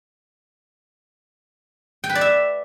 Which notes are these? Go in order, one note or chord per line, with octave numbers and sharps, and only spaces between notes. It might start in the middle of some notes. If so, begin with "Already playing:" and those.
G5
B4
D5
E5